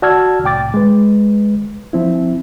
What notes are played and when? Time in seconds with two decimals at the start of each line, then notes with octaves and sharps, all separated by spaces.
0.02 F#4 D5 A5 E6 F6 G#6
0.44 C2 A2 G5 D6 A6
0.74 G#3 B4
1.93 F3 C4 E4